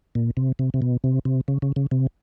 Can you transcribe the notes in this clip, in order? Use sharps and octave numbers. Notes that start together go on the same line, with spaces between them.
A#2
C3
C3
C3
B2
C3
C3
C#3
C#3
C#3
C3